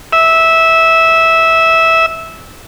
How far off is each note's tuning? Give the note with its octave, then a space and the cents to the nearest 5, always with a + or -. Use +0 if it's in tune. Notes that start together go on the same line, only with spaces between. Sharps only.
E5 -15